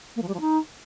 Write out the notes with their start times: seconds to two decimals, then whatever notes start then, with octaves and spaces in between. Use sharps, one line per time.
0.16 A#3
0.22 F3
0.28 G3
0.34 F3
0.40 D#4